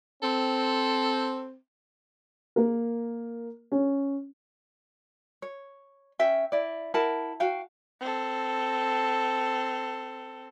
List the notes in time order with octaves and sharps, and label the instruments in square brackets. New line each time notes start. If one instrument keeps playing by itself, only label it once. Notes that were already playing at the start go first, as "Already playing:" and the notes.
[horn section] C4 [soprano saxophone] A4
[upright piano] A#3 A#4
C#4
[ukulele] C#5
C#4 E5 G5
E4 D5
E4 A#4 F#5 A5
F#4 F5 G5
[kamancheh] C4 A4